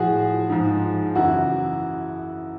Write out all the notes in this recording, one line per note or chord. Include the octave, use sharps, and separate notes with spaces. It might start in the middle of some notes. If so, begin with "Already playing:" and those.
Already playing: A2 F3 F#4 G#4
G#2 F3
F#2 C#3 E3 E4 F#4